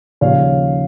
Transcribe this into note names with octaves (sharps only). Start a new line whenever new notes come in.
D#2 C#3 F3 C#5 F5